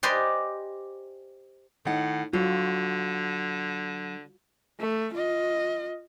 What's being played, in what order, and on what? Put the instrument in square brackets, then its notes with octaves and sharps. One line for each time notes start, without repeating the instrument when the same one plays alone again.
[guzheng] G4 B4 C5 D5 D#5 G#5
[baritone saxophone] A2 [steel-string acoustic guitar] D#3 F#5
[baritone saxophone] D3 [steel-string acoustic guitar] F#3 [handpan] F4 F#4
[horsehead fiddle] A3
F4 D#5